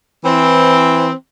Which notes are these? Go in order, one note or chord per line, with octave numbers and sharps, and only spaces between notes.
E3 C4